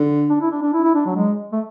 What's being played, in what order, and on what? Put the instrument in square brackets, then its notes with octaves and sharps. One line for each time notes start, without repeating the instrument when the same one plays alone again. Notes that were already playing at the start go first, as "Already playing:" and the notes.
Already playing: [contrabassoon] D3
[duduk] D4
E4
D4
D4
E4
E4
D4
F#3
G#3
A3